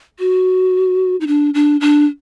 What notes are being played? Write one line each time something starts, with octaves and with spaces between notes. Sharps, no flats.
F#4
D#4
D4
D4
D4